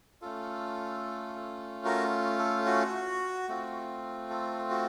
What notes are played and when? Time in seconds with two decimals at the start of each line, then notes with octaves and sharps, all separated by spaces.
0.21 A3 C#4 F4 A4
1.85 F#4 A#4
2.39 A4
2.66 F#4
3.49 A3 C4 F4
4.30 A4
4.70 F#4